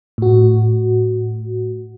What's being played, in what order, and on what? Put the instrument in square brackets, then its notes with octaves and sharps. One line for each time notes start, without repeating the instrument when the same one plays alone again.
[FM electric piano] A2 F#4